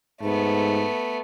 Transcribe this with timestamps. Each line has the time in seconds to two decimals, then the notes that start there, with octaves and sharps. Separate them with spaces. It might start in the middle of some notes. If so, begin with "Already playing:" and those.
0.22 G#2 A3 B3